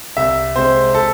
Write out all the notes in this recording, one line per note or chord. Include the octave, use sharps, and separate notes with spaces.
C2 E5
C3 G#3 C5
A4